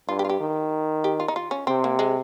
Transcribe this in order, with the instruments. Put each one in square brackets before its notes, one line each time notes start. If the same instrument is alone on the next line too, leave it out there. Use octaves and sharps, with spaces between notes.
[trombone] G2 [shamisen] F4
[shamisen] G4
F4
G4
[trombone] D#3
[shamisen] G4
F4
D#4
F4
C#4
[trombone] C3 [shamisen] C4
[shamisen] A#3
G#3